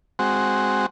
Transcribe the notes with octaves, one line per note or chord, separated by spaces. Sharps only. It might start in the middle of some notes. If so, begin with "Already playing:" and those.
G#3 C4 F#4